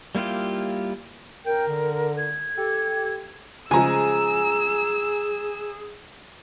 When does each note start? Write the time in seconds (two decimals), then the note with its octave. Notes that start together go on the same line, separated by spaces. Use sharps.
0.15 G3 A#3 E4 F4 G4
1.46 F#2 A#4 G5
1.67 D3
2.18 G#6
2.57 G4 A4
3.71 C#3 F3 G#3 G#4 G#5 A#5 E6